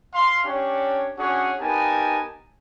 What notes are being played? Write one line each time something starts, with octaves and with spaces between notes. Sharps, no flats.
F5 C6
C#4 D4 G4 C#5
C#4 D4 F#4 G#4 C#5 F#5
B3 D#4 G4 A#4 G#5 A5